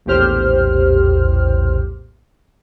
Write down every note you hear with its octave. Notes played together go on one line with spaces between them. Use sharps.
A#1 E2 A2 G4 C5 F6